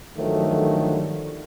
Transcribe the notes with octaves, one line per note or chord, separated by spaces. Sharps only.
G2 D3 D#3 F3 F#3 A3